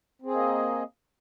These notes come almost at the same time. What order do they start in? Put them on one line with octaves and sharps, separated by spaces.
C4 G#4 A#3 D#5